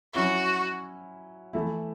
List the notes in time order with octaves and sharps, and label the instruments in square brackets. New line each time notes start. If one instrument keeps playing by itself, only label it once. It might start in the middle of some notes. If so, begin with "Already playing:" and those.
[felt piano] F#3 C#4 E4 [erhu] F#4
[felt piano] E3 A3 E4